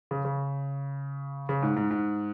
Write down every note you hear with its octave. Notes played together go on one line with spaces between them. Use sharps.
C#3
C#3
C#3
G#2
G#2
G#2